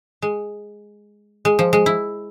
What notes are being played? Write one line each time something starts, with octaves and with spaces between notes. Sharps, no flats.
G#3
G#3
F3
G#3
E4